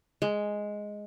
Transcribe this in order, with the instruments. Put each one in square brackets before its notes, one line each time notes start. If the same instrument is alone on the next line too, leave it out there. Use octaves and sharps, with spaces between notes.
[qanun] G#3